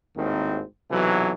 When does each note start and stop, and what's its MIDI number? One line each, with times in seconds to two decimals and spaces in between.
0.16 0.62 32
0.16 0.62 39
0.16 0.62 45
0.16 0.62 51
0.16 0.62 60
0.90 1.32 35
0.90 1.32 48
0.90 1.32 52
0.90 1.32 54